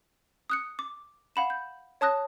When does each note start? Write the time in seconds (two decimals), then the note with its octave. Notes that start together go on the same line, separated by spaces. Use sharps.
0.50 D#6 F#6 C#7
0.79 D6
1.36 F5 F#5 B5 E7
1.50 G6
2.01 C#5 A5 D#6 F#6 A#6